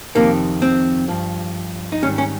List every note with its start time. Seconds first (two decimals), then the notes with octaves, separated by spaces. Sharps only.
0.15 F2 C3 D#3 A#3
0.62 C4
1.08 G2 F3
1.92 D#4
2.03 G#2 D#3 G3 C#4
2.18 C#4